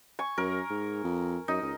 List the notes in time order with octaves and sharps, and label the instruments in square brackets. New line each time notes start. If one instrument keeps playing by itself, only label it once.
[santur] G#5 C#6
[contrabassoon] F#2 [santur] A#4
[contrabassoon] G#2
F2
[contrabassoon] F#2 [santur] D#4
[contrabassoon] C#2